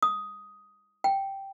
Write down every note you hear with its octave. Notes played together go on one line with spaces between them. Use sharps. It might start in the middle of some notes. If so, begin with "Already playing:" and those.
D#6
G5